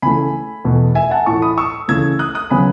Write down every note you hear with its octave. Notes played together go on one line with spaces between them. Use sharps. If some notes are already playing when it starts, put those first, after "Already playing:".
C#3 E3 A3 G#5 B5
E2 B2 A3
E5 G#5
F#5 A5
A2 E3 A3 A5 C#6
B5 D#6
C#6 E6
C#3 E3 A3 E6 G#6
D#6 F#6
D#6 F#6
C#3 F#3 B3 G#5 B5